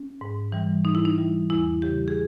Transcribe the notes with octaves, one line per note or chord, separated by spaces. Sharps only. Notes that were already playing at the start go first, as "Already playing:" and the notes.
Already playing: C#4
G#2
E3 G3
G#2 D#4
E4
D#4
E3 G3
E2 E4
C#3 E3 G3 G4
G#4